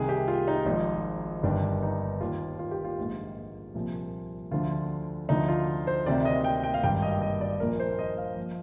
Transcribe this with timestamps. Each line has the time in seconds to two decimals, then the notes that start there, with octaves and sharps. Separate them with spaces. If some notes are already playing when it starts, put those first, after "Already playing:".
Already playing: C2 C3 D#3 G#4
0.09 G4
0.28 F4
0.48 D#4
0.66 G#1 G#2 F3 D#4
1.43 G1 G2 D#3 D4
1.82 D#4
2.20 D#2 D#3 F4
2.59 F4
2.71 G4
2.84 F4
2.98 A#1 G#2 D#3
3.75 C2 A#2 F3
4.51 D2 D3 F3 F4
5.29 D2 D3 F3 D#4
5.48 F4
5.87 C5
6.06 D2 C3 D#3 D5
6.25 D#5
6.44 G5
6.64 G5
6.74 F5
6.83 G#1 G2 D#3 G5
7.02 D#5
7.21 D#5
7.41 D5
7.60 A#1 A#2 F3 A#4
7.80 C5
7.99 D#5
8.18 F5
8.37 F3